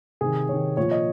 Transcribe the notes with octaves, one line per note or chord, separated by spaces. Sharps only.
C3 D#3 G#4
C3 D#3 C#5
A#2 F3 C#5
D#5